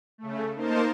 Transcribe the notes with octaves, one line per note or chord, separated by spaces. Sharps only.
C#3 A3
A#3 D#4 A#4 C5 A5